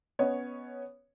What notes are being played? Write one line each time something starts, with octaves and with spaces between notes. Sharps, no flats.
B3 C#4 C#5 D#5